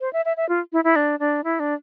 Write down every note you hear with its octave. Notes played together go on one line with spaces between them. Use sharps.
C5
E5
E5
E5
F4
E4
E4
D4
D4
E4
D4